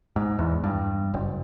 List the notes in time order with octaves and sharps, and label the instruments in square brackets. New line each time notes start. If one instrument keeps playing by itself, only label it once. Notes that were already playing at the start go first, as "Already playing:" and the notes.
[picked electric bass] G#2
E2
G2
F#1